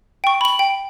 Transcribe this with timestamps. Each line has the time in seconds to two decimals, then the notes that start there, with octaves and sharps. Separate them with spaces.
0.24 G5 C#6
0.41 B5 F#7
0.59 G5